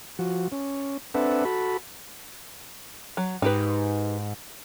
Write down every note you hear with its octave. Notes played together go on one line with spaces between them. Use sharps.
F3 F#4
C#4
C4 D4 A4 B4 E5 F#5
F#4 A4 B5
F#3
G#2 D#4 G4 B4